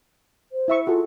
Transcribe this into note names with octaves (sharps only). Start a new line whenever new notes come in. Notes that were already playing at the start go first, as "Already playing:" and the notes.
C5
E4 E5 C#6
F4 F#4 G#4 A4